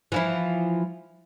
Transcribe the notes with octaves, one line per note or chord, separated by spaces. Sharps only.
E3 F3 E4